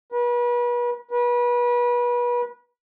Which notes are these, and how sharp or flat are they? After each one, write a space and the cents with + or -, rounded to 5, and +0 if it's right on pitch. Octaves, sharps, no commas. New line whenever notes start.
B4 -35
B4 -30